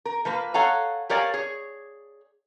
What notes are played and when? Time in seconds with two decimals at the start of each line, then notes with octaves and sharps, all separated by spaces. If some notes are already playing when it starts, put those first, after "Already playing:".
0.05 A#4
0.25 F3 A#3 B4
0.54 A4 C#5 F5 F#5 G#5 A#5
1.09 G4 A#4 C#5 D5 F5 G#5
1.34 G#4 C#5